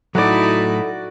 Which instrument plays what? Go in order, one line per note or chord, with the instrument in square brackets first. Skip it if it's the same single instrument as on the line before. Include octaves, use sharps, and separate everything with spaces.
[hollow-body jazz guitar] A2 F#3 [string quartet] D#4 E4 B5 [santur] F#4 D5 [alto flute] A4